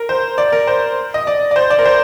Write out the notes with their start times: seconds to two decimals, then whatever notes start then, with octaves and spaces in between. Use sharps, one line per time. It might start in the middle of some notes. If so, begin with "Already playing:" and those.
Already playing: A#4
0.09 C5
0.38 D5
0.52 A#4
0.67 C5
1.14 D#5
1.27 D5
1.51 D5
1.56 C5
1.70 D5
1.79 A#4
1.85 C5